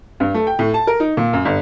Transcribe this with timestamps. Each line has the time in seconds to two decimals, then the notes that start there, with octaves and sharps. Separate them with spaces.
0.20 G2
0.34 A3
0.47 G5
0.59 A2
0.74 A5
0.87 A#4
1.00 D#4
1.17 A#2
1.33 F#2
1.45 G1